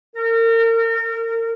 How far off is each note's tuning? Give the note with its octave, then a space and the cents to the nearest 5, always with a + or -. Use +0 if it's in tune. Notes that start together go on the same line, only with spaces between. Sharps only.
A#4 -35